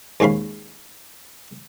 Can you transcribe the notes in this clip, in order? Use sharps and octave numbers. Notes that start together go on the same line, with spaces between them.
D#2 G#2 C#4 F5 B5